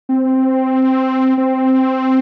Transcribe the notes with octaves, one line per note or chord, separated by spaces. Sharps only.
C4
C4